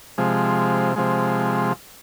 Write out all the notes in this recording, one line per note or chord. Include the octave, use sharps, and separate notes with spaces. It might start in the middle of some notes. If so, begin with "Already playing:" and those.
C3 F3 G#3
C3 F3 G#3